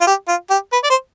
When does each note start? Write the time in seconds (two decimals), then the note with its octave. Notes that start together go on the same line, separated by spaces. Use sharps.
0.01 F4
0.07 G4
0.28 F4
0.51 G4
0.73 B4
0.84 D5
0.90 C5